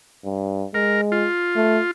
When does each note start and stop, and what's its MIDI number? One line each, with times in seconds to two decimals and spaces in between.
0.25 0.66 43
0.74 1.26 56
0.74 1.01 70
1.12 1.91 65
1.56 1.80 57